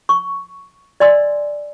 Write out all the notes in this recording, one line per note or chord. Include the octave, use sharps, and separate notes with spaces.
C#6
D5 D#5 G#5 C6 E6